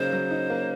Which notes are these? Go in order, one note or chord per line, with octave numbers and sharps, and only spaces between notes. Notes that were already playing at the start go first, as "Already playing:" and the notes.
Already playing: C#3 F#3 A#3 D#4 C5
F#3
D#4
A#3